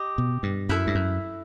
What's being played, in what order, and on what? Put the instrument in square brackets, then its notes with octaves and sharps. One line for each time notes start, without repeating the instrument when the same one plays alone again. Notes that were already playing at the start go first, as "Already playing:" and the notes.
Already playing: [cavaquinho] G4 D#5
[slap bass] B2
G2
[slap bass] F#2 [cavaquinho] E4 A4 E5
[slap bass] G2
F#2